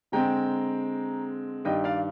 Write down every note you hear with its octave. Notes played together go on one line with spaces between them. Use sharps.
D3 G#3 C4 G5 A#5
G2 D#3 G3 D#5 G5
D5 F5